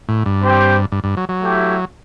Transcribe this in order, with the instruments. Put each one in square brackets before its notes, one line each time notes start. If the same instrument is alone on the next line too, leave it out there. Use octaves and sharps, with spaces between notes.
[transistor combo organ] A2
G2
[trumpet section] C4 G4 C5 G5
[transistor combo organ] G2
G2
F#3
F#3
[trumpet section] A3 E4 G4